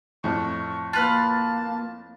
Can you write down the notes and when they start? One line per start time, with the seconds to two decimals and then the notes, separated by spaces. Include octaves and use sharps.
0.24 F2 A2 C#6
0.93 A#3 F4 B4 A5 F6